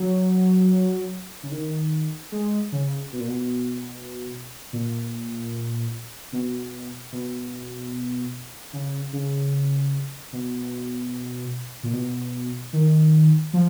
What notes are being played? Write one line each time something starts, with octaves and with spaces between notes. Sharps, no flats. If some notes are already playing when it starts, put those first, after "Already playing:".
Already playing: F#3
C#3
D#3
G#3
C#3
B2
A#2
B2
A#2
B2
B2
C#3
C#3
B2
A#2
B2
D#3
F3